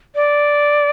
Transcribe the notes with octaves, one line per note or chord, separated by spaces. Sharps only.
D5